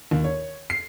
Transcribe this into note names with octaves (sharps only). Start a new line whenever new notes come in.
D#2
C#5
C7